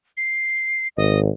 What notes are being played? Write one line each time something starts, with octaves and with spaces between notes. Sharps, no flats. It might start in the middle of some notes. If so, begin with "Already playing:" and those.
C7
G#1 D#5